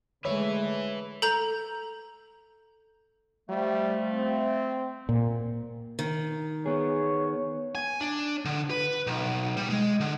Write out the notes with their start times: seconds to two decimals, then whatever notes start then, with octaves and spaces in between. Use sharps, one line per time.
0.25 D3 G#3 A3 B4 C#5 E5
1.22 A4 A#5 G6 F7
3.49 F3 G3 A3
4.14 C4
5.09 A#2
5.99 D#3
6.66 B3 G#4 C#5
7.75 G#5
8.01 D4
8.45 D3
8.70 B4
9.07 B1
9.57 G3
9.70 G#3
10.00 D3